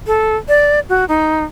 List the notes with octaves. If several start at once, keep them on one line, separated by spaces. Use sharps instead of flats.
A4
D5
F#4
D#4